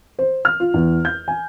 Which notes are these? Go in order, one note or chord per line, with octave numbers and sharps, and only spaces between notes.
C5
F6
F4
E2
G6
G#5